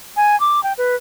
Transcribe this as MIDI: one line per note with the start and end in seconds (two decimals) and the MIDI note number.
0.17 0.38 80
0.40 0.63 86
0.63 0.73 79
0.78 0.95 71